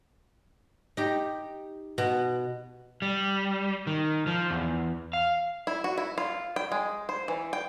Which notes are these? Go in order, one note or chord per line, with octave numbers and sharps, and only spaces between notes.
D#4 G4
B2
G3
D#3
F3
E2
F5
E4
F#4
E4
F4
G5
G#3
C5
E3
G5